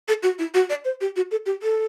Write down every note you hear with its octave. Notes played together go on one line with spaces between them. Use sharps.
A4
F#4
E4
F#4
D5
C5
G4
F#4
A4
G4
A4